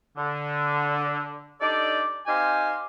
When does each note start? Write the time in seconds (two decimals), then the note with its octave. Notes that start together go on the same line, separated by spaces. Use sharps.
0.17 D3
1.61 D4 D#4 G4 A4 D5
2.27 C4 D#4 G4 C5 F5 G#5